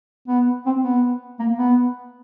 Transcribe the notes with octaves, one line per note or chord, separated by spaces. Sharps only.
B3
C4
B3
A#3
B3